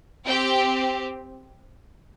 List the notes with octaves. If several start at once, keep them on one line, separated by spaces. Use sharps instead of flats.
C4 G4 G5